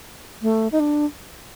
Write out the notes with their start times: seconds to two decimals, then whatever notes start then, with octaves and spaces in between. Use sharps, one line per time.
0.42 A3
0.72 D#4
0.80 D4